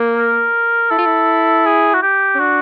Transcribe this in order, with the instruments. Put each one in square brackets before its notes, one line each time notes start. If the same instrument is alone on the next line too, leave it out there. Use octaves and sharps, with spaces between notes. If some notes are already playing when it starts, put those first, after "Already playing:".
Already playing: [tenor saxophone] A#3
[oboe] A#4
[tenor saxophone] E4 [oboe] A4
[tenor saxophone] F4
E4
[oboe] G#4
F#4
G4
[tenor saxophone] C#4
[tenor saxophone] D4 [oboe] F#4